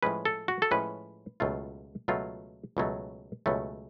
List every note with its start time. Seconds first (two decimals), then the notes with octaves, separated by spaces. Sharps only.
0.03 A2 F3 G#3 C#4 B4
0.25 A4
0.48 F#4
0.62 A4
0.71 A2 F3 G#3 C#4 B4
1.40 C#2 B2 F#3 A3 F4
2.08 C#2 B2 F#3 A3 F4
2.77 C#2 B2 F#3 A3 C#4
3.46 C#2 B2 F#3 A3 C#4